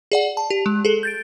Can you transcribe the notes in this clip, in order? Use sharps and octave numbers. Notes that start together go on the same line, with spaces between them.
G#4 D5 F#5
A5
G4
G#3
G#4 A4
G6 A6 D7